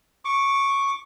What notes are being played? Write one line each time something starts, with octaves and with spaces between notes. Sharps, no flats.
C#6 D6